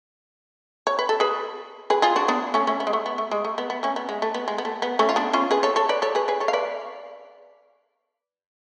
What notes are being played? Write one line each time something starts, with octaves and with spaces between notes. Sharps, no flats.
C#5
B4
A4
G#4 B4
G#4 B4
F4 G#4
D4 F#4
B3 D4
A3 C#4
A3 C#4
B3
G#3
A3
B3
A3
G#3
A3
B3
B3
A3 C#4
B3
G#3
A3
B3
G#3
B3
A3
B3
A3 C#4
F4
B3 D4
C#4 F4
G#4 B4
A4 C#5
A4 C#5
B4 D5
A4 C#5
G#4 B4
G#4 B4
A4 C#5
F5
B4 D5